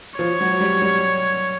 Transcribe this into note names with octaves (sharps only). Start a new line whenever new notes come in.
F3 C#5
F#3
G3
G3